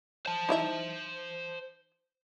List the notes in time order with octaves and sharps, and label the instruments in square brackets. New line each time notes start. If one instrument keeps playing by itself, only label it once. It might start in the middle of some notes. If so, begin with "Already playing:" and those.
[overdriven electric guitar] C5 A5
[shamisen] D#4 E4 E5